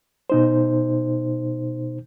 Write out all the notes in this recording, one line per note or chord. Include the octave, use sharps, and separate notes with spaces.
B2 D#4 C5